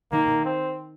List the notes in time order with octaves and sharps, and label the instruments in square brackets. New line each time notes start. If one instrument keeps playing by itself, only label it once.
[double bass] D#3 [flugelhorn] A#3
[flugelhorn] C4